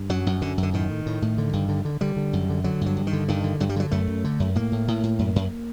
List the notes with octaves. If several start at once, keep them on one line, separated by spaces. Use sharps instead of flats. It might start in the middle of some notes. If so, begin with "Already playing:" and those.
Already playing: G2
F#2 F#3
F#2
F#2 D3
F#2
D3
A2 D#3
A2
A2
A2
D3
G2
D3
D3
D3 G3
D3
F#2
D3
D3 F#3
G2 F#3
G2
D#3
D3
G2 D#3
D3
G2 F#3
G3
D3 F#3
F#2 A3
F#2
D3
F#2
A2 A#3
A2
A2
A2
F#2
F#2